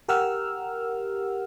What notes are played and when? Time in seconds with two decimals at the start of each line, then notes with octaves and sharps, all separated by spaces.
0.09 G4 A#4 F#5 E6 F6